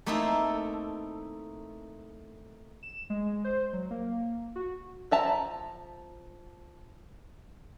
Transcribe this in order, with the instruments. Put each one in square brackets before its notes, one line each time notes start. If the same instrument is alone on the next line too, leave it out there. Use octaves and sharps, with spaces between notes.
[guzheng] A3 A#3 C4 D#4 E4 A4
[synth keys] E7
G#3
C5
F#3
A#3
F#4
[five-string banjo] F3 E5 A5 A#5